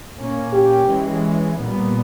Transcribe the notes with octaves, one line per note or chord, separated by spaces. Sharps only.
A#2 A#3 C#4
G4
E3 G#3 C#4
A#2 G3 B3